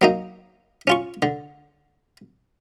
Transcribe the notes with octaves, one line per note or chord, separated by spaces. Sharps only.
F#3 A#3 D#4
C#4 F4 C#6
D3